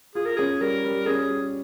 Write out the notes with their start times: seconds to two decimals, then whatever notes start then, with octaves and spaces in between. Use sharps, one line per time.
0.15 F4 G#4
0.25 A#4
0.36 C#4 G#4
0.61 G3 A#4
0.84 G3
1.06 C#4 G#4
1.30 G3